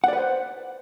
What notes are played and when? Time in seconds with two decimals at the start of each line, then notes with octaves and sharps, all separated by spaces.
0.04 F#5
0.08 D5
0.13 B4
0.18 C5